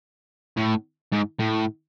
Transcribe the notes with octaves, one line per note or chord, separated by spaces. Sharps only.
A2
G#2
A2